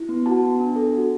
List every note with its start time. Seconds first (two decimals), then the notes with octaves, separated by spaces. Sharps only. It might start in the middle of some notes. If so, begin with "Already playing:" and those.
Already playing: E4
0.09 B3
0.26 F#4 A5
0.42 B3
0.59 D4
0.76 A4
0.93 F#4